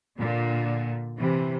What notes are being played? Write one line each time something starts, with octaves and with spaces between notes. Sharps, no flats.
A#2 D3
C3 E3